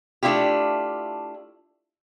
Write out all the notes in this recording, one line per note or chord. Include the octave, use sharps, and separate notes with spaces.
A3 D4 E4 F4 G4